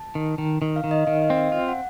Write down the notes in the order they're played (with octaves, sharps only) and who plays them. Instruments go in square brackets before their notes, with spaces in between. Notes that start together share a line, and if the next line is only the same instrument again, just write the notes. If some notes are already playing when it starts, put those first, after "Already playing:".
Already playing: [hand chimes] A5
[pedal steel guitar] D#3
D#3
D#3
[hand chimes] F5
[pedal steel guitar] D#3
[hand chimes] D#5
[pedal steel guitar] D#3 [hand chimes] F5
[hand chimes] D#5
[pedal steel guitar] C4
[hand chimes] F5
[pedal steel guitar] F4
[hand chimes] F#5